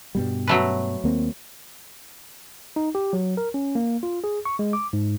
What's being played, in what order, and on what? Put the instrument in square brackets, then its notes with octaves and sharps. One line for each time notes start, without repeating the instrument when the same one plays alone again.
[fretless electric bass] G2 B2 G3
[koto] F#3 A3 B4
[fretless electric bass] D#2 A#3 C4
[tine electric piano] D#4
G4
F#3
A#4
C#4
A#3
F4
G#4
C#6
G#3
D6
G#2